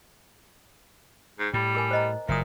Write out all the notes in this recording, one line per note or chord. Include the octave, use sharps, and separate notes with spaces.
G#2
A2 G3
G#4 A#4 G#5
C5 D#5 A#5
F#1 A#2 E5 D#6